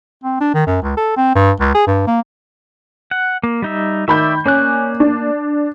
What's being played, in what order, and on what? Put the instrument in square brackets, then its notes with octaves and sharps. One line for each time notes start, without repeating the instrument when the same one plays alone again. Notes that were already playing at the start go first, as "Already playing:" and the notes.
[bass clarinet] C4
D4
D#3
F#2
C#2
A4
C4
G2
C#2
G#4
G2
A#3
[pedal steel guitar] F#5
A#3
G3 D#4 E5
[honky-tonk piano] D#3 B5 G6 [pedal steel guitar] D5 E5
[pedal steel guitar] A#3 D5 F#6 [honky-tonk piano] C#4
[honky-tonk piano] D4